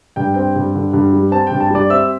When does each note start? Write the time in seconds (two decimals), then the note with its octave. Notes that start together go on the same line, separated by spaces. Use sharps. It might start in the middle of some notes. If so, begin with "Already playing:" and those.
0.16 G2 G5
0.34 C4 G5
0.56 G2
0.75 D3
0.93 G2
1.13 G3
1.32 C4 A5
1.47 G2 G5
1.60 A5
1.70 G3 D5 D6
1.90 C4 E5 E6